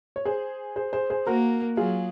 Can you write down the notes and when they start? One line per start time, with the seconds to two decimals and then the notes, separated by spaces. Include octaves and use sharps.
0.16 C#5
0.25 G#4 C5
0.76 G#4 C5
0.93 G#4 C5
1.10 G#4 C5
1.27 A#3 F#4 A#4
1.77 F#3 F4 G#4